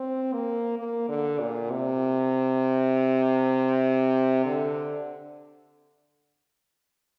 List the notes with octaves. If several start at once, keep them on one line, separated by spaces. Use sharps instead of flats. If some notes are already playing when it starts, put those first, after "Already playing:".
Already playing: C4
A#3
A#3
D3
A#2
C3
D3